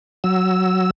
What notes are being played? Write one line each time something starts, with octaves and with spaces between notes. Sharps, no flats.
F#3 E6